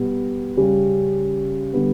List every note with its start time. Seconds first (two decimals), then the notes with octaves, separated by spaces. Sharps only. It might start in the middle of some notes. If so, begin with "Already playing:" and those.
Already playing: B2 G3 B3
0.57 C#3 G3 C#4 G4
1.73 D3 G3 B3